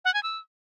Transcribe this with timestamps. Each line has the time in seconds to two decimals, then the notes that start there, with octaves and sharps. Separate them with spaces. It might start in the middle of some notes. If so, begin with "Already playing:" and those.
0.05 F#5
0.14 G#5
0.23 E6